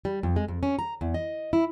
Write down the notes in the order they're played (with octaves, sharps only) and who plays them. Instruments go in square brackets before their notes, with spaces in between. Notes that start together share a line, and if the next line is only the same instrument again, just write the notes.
[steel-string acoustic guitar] G3
F2
G#3
F2
C#4
A#5
E2
D#5
E4